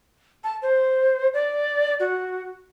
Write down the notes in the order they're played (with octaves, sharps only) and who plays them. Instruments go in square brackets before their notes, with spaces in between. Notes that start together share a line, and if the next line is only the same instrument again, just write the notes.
[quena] A5
C5
D5
F#4